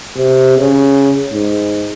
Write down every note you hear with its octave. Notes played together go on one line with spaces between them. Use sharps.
C3
C#3
G#2